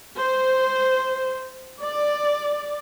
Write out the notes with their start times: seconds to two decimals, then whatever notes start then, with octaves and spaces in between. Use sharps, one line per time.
0.17 C5
1.82 D5